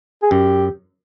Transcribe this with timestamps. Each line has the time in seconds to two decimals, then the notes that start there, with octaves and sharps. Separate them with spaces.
0.22 G#4
0.31 F#2 G4